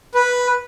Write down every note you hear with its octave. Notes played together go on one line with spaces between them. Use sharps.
B4